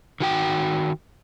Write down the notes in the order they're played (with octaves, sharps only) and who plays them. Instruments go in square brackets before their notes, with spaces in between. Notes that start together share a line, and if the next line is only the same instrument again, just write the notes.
[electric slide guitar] D#3 F#4 G5